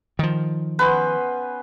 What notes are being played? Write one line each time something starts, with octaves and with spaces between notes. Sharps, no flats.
D#3 F3
B3 C#4 B4 C5